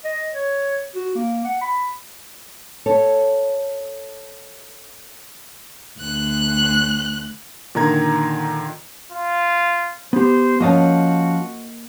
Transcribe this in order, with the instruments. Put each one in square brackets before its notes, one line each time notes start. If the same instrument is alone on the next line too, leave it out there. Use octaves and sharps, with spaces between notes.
[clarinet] D#5
C#5
F#4
A#3
F#5
B5
[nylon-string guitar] A4 C#5
[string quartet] D2 F#6
[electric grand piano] A#2 D3 D#3 A#5 G#6
[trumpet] F4
[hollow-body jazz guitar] B3 G4 [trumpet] C5
[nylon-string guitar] F3 C#4 [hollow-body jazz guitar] A#3 D#5 A5 [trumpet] F#4